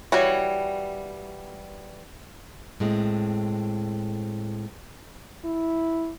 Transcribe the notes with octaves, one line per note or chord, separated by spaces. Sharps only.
E3 G3 F#4 C#5
A2 G#3 C4
E4